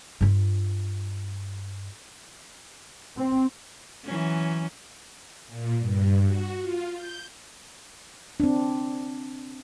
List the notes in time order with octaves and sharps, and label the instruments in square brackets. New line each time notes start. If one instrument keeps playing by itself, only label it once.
[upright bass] G2 F4
[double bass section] C4
[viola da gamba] E3 F#3 C#4
[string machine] A#2
G2
F#4
F4
G6
[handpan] C4 D4